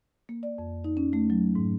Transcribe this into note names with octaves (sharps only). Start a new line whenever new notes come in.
A#3
D5
F2
D#4
C#4
A3
F#3
G#2